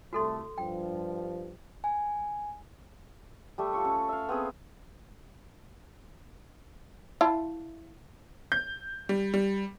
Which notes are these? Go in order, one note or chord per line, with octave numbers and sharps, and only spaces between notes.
C2 A3 F#4 A4 C6
G2 F3 G5
G#5
G3 A3 E5
F4 A4 C#6
C#4
E5 F5
B3 C4 G#4
E4 F4 A5
G6
G3
G3